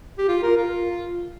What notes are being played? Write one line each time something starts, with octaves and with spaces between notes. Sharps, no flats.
G4
F4
A#4
F4